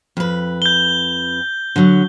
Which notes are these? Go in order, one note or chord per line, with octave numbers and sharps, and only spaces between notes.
F2 B4
G6 G7
D3 F#3